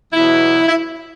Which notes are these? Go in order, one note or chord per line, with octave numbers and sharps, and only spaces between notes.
E2 B2 F#3 E4
E4